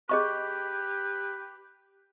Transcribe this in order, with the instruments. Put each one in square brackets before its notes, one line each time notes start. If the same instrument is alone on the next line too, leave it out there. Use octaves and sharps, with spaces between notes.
[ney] G4 [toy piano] G#4 D#5 C#6 [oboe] B4